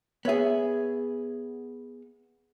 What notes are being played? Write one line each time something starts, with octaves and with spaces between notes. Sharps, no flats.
B3 G#4 C#5 E5